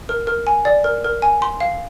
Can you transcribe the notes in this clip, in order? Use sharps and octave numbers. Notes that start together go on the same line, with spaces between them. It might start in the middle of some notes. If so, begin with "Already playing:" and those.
A#4
A#4
G#5
D5
A#4
A#4
G#5
C6
F5